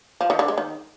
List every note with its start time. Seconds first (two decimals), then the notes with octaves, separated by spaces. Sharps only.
0.21 F3
0.30 D#3
0.39 D3
0.48 G#3
0.58 D#3